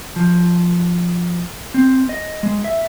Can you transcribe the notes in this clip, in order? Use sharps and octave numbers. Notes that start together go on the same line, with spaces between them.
F3
C4
D#5
G#3
E5